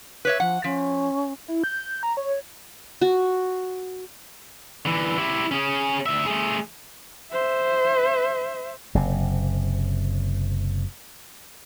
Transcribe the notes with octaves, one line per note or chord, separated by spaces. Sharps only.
B4 C#5 E5
F3 F#5
F3 C#4
E4
G6
A#5
C#5
F#4
D3 E3
E4 G4
C#4 G#4
D2 E5
A3 G#4
C5 E5
F#1 C3